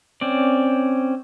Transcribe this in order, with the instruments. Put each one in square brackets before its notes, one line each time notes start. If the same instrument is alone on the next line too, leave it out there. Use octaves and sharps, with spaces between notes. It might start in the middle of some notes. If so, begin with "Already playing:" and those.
[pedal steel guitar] C4 C#4 D5